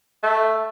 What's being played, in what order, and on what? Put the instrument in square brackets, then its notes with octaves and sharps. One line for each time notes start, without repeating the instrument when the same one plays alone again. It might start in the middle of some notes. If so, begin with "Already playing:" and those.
[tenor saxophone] A3